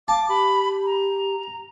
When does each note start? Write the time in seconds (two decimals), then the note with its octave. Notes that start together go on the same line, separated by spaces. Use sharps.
0.08 F5 A5 D6
0.29 G4 B5
0.86 A#5